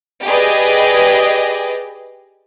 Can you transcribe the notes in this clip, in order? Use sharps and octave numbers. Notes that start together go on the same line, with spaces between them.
G4 G#4 B4 D5 D#5